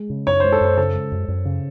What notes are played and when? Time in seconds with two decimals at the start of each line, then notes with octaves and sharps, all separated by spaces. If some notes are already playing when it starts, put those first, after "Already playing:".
Already playing: G#3
0.10 C#3
0.27 F#2 C#5
0.40 C5
0.44 G#3
0.52 A4
0.61 F#2 C5
0.77 C#3 A4
0.95 G#3
1.12 F#2
1.28 F#2
1.45 C#3